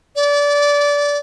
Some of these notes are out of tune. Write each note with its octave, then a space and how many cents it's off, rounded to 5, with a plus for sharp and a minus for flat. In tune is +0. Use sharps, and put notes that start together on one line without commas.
D5 -25